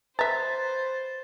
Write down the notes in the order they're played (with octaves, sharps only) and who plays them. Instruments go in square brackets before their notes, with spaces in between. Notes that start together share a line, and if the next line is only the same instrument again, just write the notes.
[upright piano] B4 [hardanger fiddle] C5 [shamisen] E5 A#5 [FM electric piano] A6